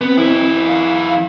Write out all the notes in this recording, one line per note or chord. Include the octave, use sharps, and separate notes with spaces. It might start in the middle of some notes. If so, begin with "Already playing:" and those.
B3 C4
F2 E4
F5